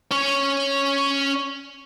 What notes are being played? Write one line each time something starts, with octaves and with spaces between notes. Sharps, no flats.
C#4 C#5